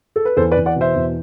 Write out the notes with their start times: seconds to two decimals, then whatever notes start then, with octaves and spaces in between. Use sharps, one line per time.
0.16 A4
0.25 B4
0.37 E2 A4 C5
0.51 B4 D5
0.57 E2
0.66 D5 F#5
0.76 B2
0.81 C5 E5
0.95 E2